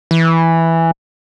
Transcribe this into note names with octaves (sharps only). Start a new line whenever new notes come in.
E3